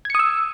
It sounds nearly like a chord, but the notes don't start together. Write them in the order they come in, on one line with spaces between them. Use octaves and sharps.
G#6 C#7 D#6 E6